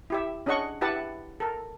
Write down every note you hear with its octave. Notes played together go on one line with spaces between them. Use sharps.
E4 G4 E5
C#4 D4 G#4 D#5 F#5 C#6
E4 G4 B4 E5 F#5 A5
A4 A#4